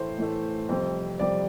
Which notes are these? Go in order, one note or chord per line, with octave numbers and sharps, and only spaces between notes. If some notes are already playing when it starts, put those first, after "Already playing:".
Already playing: A2 E3 A3 C5
A2 E3 A3
F2 C3 G3 C4
F2 C3 G3 C4 D5